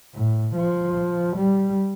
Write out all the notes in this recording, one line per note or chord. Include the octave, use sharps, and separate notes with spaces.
A2
F3
G3